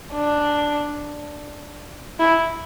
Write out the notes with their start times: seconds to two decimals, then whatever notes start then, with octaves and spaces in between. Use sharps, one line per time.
0.14 D4
2.19 E4